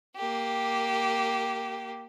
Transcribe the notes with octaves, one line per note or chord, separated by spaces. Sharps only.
A#3 G4